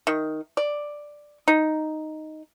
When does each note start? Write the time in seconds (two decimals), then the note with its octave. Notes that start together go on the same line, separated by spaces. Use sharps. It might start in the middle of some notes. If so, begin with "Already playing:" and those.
0.07 D#3
0.57 D5
1.48 D#4